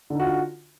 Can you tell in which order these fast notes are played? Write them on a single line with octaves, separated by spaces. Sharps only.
D3 D#4 F#4 F4